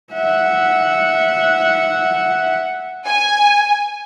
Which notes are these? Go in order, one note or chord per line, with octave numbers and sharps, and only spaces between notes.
E5 F#5
G#5